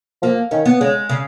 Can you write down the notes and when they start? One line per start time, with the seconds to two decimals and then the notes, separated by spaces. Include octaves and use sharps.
0.22 F3 A#3
0.51 D#3 C#4
0.65 B3
0.80 C#3 G#3
1.09 C#3